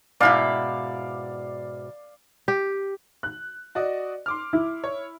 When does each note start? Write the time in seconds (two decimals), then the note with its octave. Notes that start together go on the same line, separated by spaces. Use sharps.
0.20 G#2 B2 E4 D5 F5
2.48 G4
3.23 F#6
3.75 F#4 D5 D#5
4.26 C6 D6 F6
4.53 E4
4.84 C#5